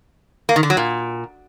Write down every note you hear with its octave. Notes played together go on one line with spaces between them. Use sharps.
A#3
D#3
D3
F#3
A#2